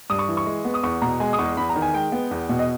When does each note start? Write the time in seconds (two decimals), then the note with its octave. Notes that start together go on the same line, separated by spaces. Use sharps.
0.10 G2 D#6
0.19 C#6
0.28 E3
0.37 C#6
0.46 G#3
0.65 B3
0.74 D#6
0.83 E2 C#6
1.02 B2 A#5
1.20 G#3 G#5
1.33 D#6
1.38 E2 C#6
1.57 E2 B5
1.70 A#5
1.76 D#3
1.82 G#5
1.94 G#3 G5
2.12 B3
2.31 E2
2.49 B2
2.59 D#5